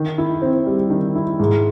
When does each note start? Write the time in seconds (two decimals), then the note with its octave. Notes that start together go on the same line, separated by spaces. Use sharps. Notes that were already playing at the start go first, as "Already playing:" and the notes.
Already playing: D#3
0.18 E4
0.42 C4
0.66 G3
0.90 D#3
1.16 E4
1.40 G#2